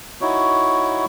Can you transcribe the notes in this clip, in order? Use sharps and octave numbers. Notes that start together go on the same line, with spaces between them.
D#4 E4 F#4 C#5